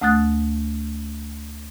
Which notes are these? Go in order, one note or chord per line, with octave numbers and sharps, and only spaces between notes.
D2 A3 D#6 F#6 A6